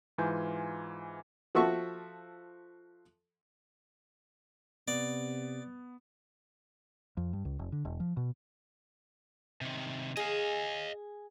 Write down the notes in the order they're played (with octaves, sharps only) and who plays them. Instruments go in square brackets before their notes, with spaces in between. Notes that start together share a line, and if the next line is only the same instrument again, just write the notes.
[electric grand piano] G#2 E3 F4 G#5 G6
[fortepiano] F3 F#4 A4 E5 C#6
[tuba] C3 [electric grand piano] B3 [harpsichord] D5
[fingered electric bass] F2
G2
C#2
F1
D3
E1
F3
B2
[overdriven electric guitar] C3 D#3
[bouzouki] G#4 [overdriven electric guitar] D#5 F5